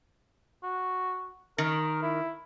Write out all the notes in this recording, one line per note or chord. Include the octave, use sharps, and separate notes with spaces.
F#4
D#3 A#4
E4